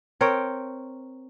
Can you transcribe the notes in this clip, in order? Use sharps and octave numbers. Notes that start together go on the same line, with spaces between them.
C4 A#4 C#5 G5